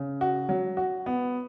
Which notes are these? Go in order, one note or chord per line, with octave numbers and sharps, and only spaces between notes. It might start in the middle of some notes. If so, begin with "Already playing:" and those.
Already playing: C#3
F#4
F#3
F#4
B3